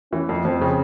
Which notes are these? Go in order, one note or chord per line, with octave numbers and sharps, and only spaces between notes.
E3 C#4
F2
F2 C4
C#3